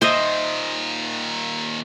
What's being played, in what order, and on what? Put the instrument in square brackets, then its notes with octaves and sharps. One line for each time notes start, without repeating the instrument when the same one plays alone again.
[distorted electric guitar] A#2 D#3 [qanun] C5 D#5 E5